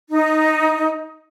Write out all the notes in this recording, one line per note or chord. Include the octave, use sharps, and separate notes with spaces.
D#4